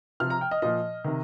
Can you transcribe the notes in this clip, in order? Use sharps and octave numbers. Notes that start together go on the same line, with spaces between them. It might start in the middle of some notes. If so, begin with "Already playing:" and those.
C3 F3 F6
A#5
G5
D#5
A#2 F3 D#5
C3 D#3